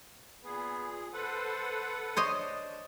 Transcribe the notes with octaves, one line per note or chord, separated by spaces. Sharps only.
A#2 B3 G#4
A4 B4 C5 F#5
D4 C5 C#5 D#5